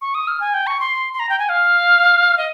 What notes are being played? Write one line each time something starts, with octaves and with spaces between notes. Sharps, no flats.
C#6
D#6
F6
G#5
G5
C#6
C6
C6
A#5
G5
G#5
F5
D#5